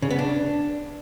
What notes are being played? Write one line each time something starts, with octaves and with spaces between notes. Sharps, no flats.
C#3
B3
D4